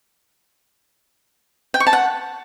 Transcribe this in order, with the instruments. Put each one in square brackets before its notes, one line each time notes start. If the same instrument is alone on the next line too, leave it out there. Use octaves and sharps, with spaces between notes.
[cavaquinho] G5
C#6
A5
F#5